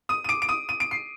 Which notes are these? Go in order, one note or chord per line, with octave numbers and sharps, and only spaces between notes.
D#6 D#7
D#7
D6 D7
D7
D#6 D#7
D#7
D7
C7